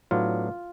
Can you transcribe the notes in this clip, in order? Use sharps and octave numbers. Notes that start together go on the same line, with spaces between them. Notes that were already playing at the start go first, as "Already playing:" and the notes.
A2 F#3 B3 D4 F4